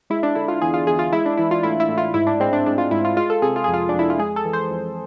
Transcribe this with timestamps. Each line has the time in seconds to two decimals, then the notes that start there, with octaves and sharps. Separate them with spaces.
0.10 G#3 E4
0.23 D4
0.35 D3 E4
0.48 F4
0.62 E2 G#4
0.74 F4
0.87 E2 G#4
0.99 F4
1.13 G#3 E4
1.26 D4
1.37 E3 E4
1.51 F4
1.63 A2 E4
1.80 E4
1.88 A2
1.98 F4
2.14 G#2 E4
2.27 D4
2.40 G#3 C4
2.53 D4
2.66 G#3 D4
2.78 F4
2.91 G#2 E4
3.05 F4
3.17 G#3 F4
3.30 A4
3.42 C3 G#4
3.56 F4
3.64 F2 G#4
3.74 F4
3.89 D4
3.94 F2 E4
4.10 F4
4.19 G#3 G#4
4.36 A4
4.45 E3
4.53 C5
4.71 F2